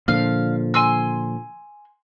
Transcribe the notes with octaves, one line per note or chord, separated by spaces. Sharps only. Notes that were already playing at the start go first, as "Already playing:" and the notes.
A#2 D3 F3 F5
G#5 C6 E6